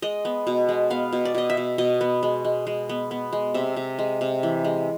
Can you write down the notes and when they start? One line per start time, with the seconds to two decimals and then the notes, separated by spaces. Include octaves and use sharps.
0.02 G#3 D#5
0.25 B3
0.47 B2
0.69 G#3
0.90 B3 F5
1.13 B2
1.25 D5
1.35 B2 D#5
1.50 E5
1.57 B2
1.78 B2 D#5
2.01 B3
2.23 G#3
2.45 G#3
2.67 G#3
2.89 B3
3.11 B3
3.33 G#3
3.54 C3 E5
3.76 C3
3.99 G#3
4.21 C3
4.43 E3
4.64 G#3